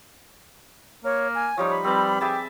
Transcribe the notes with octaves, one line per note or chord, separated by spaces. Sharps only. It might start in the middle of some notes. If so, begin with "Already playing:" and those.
A#3 C#5
G#5
F3 G3 D#4 C#5
B5
G3 C4 B4 A5
G4 G#4 E5 A5